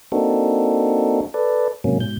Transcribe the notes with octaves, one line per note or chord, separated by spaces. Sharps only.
A#3 C4 D4 D#4 F#4 A4
A4 B4 D5
G#2 C3 F#3 A#3 C#4
G#2 B2 G6